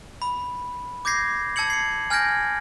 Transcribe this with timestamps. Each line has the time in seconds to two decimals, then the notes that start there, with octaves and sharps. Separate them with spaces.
0.22 B5
1.05 D6 G6 G#6 A#6 C7
1.56 A5 E6 G#6 C#7 F#7
1.70 C7 C#7
2.10 G#5 F6 G6 G#6 A#6 D7